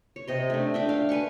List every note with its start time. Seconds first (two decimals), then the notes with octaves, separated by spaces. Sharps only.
0.16 C#5
0.28 C3 D#5 C6
0.50 A3 D4
0.74 D4 E5 G5
0.89 D4 F5
1.09 B4 G#5 C6 C#6